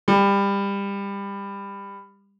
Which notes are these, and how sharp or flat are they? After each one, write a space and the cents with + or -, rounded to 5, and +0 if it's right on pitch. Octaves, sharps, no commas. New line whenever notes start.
G3 +25